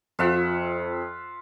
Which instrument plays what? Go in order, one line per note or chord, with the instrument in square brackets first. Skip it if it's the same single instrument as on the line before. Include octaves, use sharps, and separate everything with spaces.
[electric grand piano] F2 [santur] F4 E5 F#5